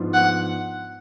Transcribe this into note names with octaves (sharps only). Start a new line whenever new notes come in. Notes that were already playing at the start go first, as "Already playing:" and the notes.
Already playing: G#2 F3 B3 D4 F4
F#5